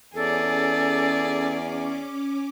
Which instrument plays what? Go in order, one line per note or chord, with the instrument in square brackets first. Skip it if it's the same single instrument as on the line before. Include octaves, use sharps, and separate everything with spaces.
[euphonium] E2 [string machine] C#4 D6 [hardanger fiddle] G#4 D5 [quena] A4